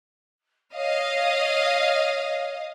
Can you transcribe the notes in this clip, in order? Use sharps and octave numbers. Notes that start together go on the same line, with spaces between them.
C#5 D#5 F5